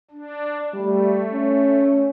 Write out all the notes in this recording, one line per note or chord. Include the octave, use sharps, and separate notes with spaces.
D4
G3 A3
C#4